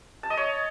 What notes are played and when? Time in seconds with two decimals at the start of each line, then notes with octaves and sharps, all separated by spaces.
0.23 A5
0.30 D#5
0.37 C#5